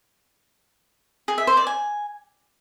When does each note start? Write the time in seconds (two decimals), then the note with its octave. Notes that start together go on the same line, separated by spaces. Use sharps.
1.28 G#4
1.38 E5
1.47 C5
1.57 D5
1.67 G#5